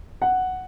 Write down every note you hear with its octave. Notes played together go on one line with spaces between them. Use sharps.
F#5